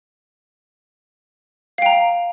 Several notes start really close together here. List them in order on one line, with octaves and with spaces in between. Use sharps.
F5 G5 A#5